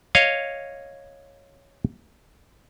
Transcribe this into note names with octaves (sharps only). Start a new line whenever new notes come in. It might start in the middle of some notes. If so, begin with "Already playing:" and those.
C#5 D#5 F5